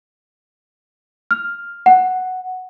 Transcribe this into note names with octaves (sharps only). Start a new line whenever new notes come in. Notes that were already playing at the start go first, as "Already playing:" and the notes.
F6
F#5